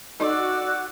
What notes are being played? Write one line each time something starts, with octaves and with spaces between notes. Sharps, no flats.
D#4 F#4 A4 D5 D#5 E6